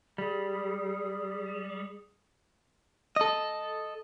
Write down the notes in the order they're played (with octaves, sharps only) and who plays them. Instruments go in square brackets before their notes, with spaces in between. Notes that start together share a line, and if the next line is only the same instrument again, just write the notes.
[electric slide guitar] G3 [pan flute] G#4
[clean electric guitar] A4 D#5